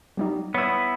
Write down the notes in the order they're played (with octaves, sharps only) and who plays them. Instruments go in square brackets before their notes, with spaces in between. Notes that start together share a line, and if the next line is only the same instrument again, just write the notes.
[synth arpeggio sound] F#3 G3 D#4
[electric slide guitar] B3 E4 [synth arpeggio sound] C#5 D#6